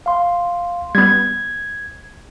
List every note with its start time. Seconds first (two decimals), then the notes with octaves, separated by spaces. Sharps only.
0.06 F5 C6
0.95 G3 B3 G#6